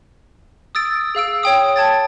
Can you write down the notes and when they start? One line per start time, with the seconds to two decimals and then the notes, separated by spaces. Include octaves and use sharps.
0.75 D#6 E6 A6 D7
1.15 G#4 F5 E6 D7
1.43 C#5 G5 D#6
1.76 G5 A5 G#6 A6